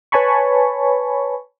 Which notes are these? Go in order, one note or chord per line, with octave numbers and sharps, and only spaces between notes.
B4 C#5 G#5 A5 B5 C#6